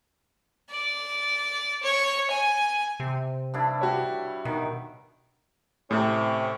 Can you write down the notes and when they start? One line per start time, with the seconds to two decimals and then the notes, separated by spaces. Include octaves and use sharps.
0.70 D5
1.83 C#5
2.31 G#5
3.00 C3
3.54 G2 D4 E4
3.81 F#4 G4 C#5
4.45 B2 D#3
5.91 A2 C3 C#4